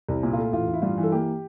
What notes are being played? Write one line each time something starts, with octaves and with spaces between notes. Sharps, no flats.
C2
A#2
A3 F4
A1 F4
A1
E4
G2 F4
E3
A4
A#3 G4